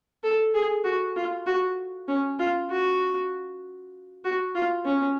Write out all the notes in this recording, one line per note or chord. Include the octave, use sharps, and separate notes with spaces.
A4
G#4
F#4
F4
F#4
C#4
F4
F#4
F#4
F4
C#4